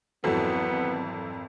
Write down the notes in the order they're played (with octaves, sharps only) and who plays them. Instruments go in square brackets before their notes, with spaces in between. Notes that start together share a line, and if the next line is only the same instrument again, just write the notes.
[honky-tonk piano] G#1 F2 [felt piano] E3 F#3 A4 [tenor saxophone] B3